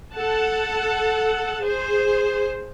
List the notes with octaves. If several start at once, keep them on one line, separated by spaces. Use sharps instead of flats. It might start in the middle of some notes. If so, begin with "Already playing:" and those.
A4 F#5 A5
G#4 C5